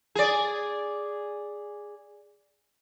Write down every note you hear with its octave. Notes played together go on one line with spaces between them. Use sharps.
G#4 D5